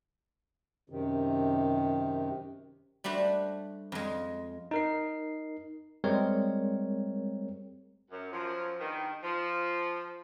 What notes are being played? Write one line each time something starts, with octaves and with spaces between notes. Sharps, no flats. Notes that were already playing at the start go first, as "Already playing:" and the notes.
F#2 C3 D#3
G3 A3 D4 F#4 C5
F2 G#3
D#4 A#4 C7
G3 G#3 C4 A#4 C#5
F#2
F#2 F3
E2 G2 D#3
F3